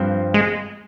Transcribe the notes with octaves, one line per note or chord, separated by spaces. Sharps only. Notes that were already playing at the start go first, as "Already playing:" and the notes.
Already playing: G2 F3 C4
G#3